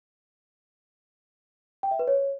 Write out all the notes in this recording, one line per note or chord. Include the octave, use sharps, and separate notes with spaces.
G5
E5
B4
C#5